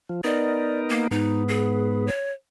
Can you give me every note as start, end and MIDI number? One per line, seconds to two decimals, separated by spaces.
0.09 0.21 53
0.24 1.07 59
0.24 1.07 63
0.24 1.07 70
0.24 0.79 74
0.89 1.07 58
1.11 2.10 44
1.11 2.10 59
1.11 1.43 63
1.48 2.05 68
2.07 2.32 73